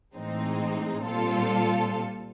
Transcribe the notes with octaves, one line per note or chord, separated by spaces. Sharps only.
A2 E3 G#3 C4 D#4
A#2 G3 C4 F4 A4